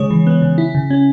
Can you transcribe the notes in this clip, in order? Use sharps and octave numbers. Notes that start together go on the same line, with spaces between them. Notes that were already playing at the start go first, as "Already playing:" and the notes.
Already playing: C#3 G#3 C#5
E3
B3
C#3
E4
C#3
C#4